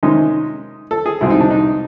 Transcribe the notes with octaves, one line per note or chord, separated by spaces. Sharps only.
C3 D#3 G#3 C#4 D#4
A4
G#4
C2 B2 G#3 C4 E4
D#4
D4
D#4